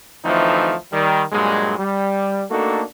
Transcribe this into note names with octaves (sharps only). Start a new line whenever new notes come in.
D2 E3 F3 A3 C4 D#4
D#3 G3
G2 A#2 F#3 G#3
G3
A3 A#3 D4 D#4 F#4 A4